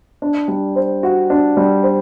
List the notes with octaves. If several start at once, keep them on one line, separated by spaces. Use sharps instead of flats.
D4
G3
C5
F#4
D4
G3
C5